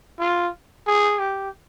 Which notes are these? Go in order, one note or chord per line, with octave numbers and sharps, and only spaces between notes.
F4
G#4
G4